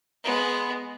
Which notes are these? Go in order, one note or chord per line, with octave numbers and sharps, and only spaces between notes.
G#3 B3